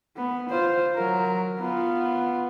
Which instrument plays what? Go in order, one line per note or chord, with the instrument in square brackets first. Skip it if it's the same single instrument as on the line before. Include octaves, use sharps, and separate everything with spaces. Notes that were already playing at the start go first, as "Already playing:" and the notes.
[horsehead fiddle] B3
F4 C5
F#3 A#4
B3 F4